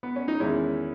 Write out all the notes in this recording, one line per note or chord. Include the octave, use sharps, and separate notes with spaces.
B3
C#4
D#4
E2 D#3 G#3 C#4 E4